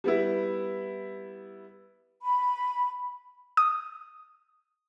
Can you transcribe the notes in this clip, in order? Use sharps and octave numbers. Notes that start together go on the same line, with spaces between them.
G3 B3 E4
B5
D#6